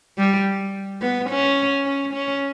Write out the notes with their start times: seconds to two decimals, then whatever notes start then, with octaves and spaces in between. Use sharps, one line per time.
0.18 G3
1.01 B3
1.30 C#4
1.86 C#4
2.13 C#4